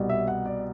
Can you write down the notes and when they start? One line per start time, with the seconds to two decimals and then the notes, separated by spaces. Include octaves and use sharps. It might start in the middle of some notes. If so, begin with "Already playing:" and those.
Already playing: C2 B2 G3
0.09 E5
0.27 F#5
0.46 D5